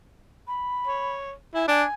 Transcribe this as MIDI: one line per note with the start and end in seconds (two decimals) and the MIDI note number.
0.47 1.14 83
0.87 1.33 73
1.54 1.64 64
1.54 1.63 80
1.68 1.84 62
1.68 1.94 80